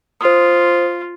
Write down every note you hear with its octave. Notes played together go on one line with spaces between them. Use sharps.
F4 C5 D#6